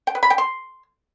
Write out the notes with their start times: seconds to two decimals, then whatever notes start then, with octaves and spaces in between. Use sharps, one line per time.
0.07 G5
0.15 B4
0.23 B5
0.30 G5
0.38 C6